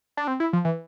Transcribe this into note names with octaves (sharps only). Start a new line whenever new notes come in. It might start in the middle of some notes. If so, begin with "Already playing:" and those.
D4
C4
E4
F3
E3